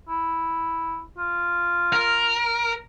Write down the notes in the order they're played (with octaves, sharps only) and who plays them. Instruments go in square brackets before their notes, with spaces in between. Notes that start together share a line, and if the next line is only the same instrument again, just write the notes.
[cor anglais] E4
F4
[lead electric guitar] A#4